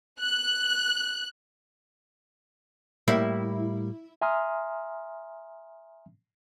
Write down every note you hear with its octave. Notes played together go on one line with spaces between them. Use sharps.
F#6
A2 G3 A#3 E4
E5 G#5 A#5 C6 D#6 F6